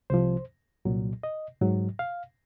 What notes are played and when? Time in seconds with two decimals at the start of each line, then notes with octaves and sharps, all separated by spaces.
0.10 C2 C3 F3 C5
0.85 C2 A#2 F#3
1.23 D#5
1.61 G#2 F#3
1.99 F5